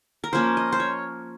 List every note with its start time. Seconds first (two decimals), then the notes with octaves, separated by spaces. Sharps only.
0.24 A#4
0.33 F3 A#3 C#4 C5
0.57 D#5
0.72 C5
0.80 C#5